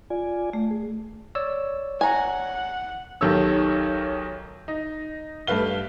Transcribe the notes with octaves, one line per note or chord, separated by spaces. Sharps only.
F4 D5 G#5
A3
G#4
C#5 D5 E6
F#5 G#5 A#5
B1 D#3 G4 A4 C#5 E6
D#4
G2 A3 B4 F5 G7